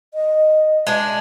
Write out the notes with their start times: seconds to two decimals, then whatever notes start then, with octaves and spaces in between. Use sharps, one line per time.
0.14 D#5
0.87 G#3 D4